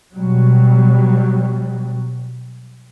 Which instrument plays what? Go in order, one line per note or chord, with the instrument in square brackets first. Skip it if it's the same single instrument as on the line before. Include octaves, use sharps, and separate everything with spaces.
[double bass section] B2 F#3 G3